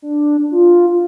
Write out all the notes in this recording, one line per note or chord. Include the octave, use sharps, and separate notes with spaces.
D4
F4